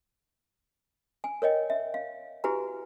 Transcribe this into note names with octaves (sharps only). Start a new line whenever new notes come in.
G#5
A#4 C#5 D#5 G5
E5
F5
E4 F#4 G4 B4 G#5 A#5